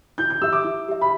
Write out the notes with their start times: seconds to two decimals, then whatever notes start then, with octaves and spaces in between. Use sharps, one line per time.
0.18 E4 G6
0.30 G6
0.42 G4 E5 E6
0.53 D6
0.65 E4
0.88 G4 E5
1.01 B5